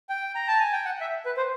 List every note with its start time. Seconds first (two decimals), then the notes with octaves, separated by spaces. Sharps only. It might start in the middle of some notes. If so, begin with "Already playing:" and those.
0.09 G5
0.35 A#5
0.48 A5
0.60 G#5
0.72 G5
0.85 F#5
1.01 E5
1.26 B4
1.37 C5